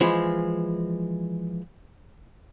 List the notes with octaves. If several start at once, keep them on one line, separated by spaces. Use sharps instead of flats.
E3 F3 G#3